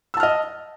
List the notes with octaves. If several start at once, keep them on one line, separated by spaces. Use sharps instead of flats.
D#5 A5 E6 F6